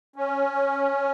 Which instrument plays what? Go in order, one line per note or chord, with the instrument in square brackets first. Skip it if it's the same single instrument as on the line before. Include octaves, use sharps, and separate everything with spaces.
[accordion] C#4